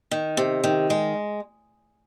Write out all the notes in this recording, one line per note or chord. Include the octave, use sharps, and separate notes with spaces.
D#3
C3
D#3
G#3